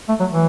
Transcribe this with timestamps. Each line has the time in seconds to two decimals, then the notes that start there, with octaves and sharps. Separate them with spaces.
0.09 A3
0.20 F#3
0.31 E3